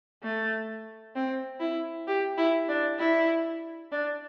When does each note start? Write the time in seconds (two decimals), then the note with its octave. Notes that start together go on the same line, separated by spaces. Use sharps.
0.23 A3
1.15 C4
1.60 E4
2.08 G4
2.38 E4
2.69 D4
2.99 E4
3.92 D4